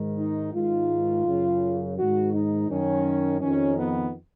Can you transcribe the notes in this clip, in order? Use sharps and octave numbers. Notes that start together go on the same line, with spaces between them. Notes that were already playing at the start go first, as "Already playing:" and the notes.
Already playing: G#2 D#3
D#4
G#2 D#3 F4
F#2 C#3
G#2 D#3 F#4
D#4
F#2 D#3 C#4
F2 D#3 C#4
B3